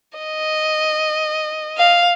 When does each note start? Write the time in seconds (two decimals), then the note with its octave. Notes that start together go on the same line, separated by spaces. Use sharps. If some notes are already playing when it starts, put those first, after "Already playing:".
0.18 D#5
1.77 F5